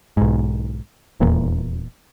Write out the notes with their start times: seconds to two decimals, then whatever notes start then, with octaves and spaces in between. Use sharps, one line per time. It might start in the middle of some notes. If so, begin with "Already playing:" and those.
0.17 B1 G#2
1.20 D#1 E2 A#2